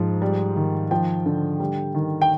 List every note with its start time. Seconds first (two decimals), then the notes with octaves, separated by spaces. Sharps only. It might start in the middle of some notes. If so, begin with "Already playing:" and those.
Already playing: G#2 F3
0.22 G3
0.56 D#3
0.91 F3 G5
1.26 D3
1.60 G3
1.95 D#3
2.22 G5